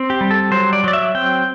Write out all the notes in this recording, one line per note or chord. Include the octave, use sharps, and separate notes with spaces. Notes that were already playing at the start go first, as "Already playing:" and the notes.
Already playing: C4
G4
G3
A4
F#3 C5
D5
F#3 D5
E5
C4 G5